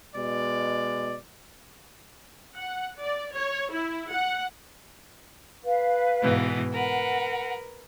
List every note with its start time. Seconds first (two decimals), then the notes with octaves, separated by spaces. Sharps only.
0.16 B2 G#3 D5
2.57 F#5
3.01 D5
3.32 C#5
3.71 E4
4.11 F#5
5.64 B4 F5
6.21 G#2 B2 E3
6.72 A#4 B4 F#5